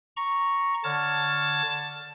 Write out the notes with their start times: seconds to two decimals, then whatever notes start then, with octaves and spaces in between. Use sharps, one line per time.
0.17 A#5 C#6
0.84 D3 C#5 A5 F6